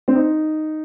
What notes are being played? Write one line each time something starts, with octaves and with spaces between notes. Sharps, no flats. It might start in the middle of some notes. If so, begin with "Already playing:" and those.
C4
D#4